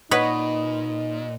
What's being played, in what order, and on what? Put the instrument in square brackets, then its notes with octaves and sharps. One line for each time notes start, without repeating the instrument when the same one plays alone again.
[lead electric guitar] A#2 [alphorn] D#4 [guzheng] B4 C#5 F#5 [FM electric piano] D#5